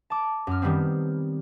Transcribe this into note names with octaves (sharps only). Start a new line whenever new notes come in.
A5 D6
F#2 F6
D#3 G3 B3 C4